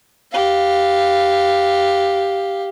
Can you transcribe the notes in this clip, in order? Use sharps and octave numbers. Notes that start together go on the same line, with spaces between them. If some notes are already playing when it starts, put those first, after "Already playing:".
G4 F5